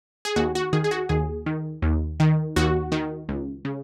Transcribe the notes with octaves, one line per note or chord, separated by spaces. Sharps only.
G#4
D#2 F#4
F#4
D#3 G#4
G#4
F#4
D#2 G#4
D#3
D#2
D#3
D#2 F#4
D#3
C#2
C#3